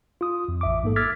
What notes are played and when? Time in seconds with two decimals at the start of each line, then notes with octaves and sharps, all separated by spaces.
0.21 F4 D#6
0.48 F2
0.61 A1 E5 D6
0.84 G#2 A#3 A4
0.96 D6 E6 F6 G#6 A6 B6